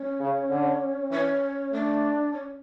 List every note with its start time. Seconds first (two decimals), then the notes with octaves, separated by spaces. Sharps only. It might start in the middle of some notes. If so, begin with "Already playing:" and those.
Already playing: C#4
0.20 C#3
0.50 D3
1.11 E3 C#4
1.72 A3 D4
2.33 C#4